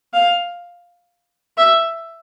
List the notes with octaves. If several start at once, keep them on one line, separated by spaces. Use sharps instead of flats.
F5
E5